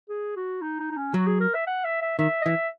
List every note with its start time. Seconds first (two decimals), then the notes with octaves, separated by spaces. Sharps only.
0.09 G#4
0.36 F#4
0.62 D#4
0.80 D#4
0.91 D#4
0.97 C#4
1.14 F#3 F#4
1.27 G#4
1.40 A#4
1.54 E5
1.67 F#5
1.84 E5
2.02 E5
2.19 D#3 E5
2.41 D#5
2.45 E3 E5